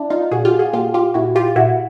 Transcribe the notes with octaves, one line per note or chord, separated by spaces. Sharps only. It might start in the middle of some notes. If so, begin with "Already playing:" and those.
Already playing: D4 E4
D#4 F4
A#2 F#4 G#4
F4 G4
F#4 G#4
A#2 F4 G4
F4 G4
A#2 E4 F#4
F4 G4
A#2 E4 F#4